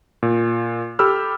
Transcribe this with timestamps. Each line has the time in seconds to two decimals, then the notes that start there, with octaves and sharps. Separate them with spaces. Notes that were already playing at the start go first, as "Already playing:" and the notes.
0.23 A#2
0.99 G4 A4 B5 E6 F6